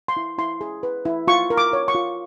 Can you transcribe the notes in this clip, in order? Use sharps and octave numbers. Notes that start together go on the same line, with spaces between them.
C6
E4
E4 C6
G#4
B4
E4
F4 C#6
A#4
D6
C#5
C#6
F4